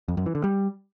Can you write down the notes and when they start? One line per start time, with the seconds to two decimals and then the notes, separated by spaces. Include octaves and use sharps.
0.08 F2
0.17 F#2
0.26 E3
0.35 D3
0.44 G3